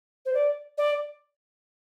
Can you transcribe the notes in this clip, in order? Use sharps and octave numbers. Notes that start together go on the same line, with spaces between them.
C5
D5
D5